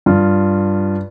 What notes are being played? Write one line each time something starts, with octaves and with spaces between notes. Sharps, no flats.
G2 F4